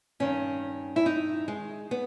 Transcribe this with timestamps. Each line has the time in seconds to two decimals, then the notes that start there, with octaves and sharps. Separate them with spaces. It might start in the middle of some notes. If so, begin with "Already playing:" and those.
0.20 G2 D#3 C#4
0.96 E4
1.06 D#4
1.48 G#3
1.91 B3